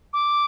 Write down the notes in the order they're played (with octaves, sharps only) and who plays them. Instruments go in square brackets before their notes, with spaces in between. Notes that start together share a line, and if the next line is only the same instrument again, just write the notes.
[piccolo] D6